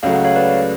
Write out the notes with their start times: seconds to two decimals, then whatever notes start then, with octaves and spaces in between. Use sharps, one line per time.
0.03 C#2 C#3 F#3 A3 F5
0.14 F#5
0.25 C#5 F5
0.36 B4 D5